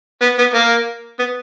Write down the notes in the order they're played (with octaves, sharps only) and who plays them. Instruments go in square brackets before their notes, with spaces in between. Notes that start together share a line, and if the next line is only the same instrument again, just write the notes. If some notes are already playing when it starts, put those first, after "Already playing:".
[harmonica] B3
B3
A#3
B3